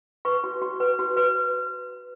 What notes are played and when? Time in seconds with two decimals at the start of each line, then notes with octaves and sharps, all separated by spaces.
0.25 B4 C#6
0.44 F#4
0.62 F#4
0.80 B4
0.99 F#4
1.17 B4